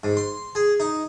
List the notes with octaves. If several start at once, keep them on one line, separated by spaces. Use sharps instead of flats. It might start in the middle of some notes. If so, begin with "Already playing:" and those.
G#2
C6
G#4
D#4